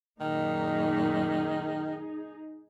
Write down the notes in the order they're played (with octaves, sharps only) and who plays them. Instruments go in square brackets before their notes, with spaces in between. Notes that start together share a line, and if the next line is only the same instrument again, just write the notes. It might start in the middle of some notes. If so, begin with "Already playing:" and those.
[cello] F#2 A#2 [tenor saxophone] D#3 [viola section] D#4 G#4